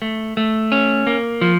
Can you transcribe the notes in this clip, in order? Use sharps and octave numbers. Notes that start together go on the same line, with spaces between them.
A3
A3
C#4
A#3
F3